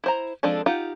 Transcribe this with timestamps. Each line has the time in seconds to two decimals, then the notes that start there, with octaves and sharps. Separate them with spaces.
0.04 E4 C5 A#5
0.43 F3 G#3 C4 D4 A4
0.66 D#4 F4 G4 F#5